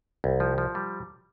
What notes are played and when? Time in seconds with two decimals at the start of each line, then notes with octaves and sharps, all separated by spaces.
0.24 C2
0.40 F3
0.58 F3
0.75 G3